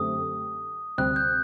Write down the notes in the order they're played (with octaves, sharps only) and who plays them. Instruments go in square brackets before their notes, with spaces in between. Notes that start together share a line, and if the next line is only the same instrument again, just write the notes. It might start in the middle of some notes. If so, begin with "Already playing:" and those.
Already playing: [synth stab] F#2 D3 A3 C4 G4 [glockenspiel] D#6
[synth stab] D2 C3 G3 C4 [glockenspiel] F#6
[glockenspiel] G6